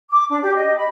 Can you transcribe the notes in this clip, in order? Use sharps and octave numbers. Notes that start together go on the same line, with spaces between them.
D6
D4
G4
D#5
B5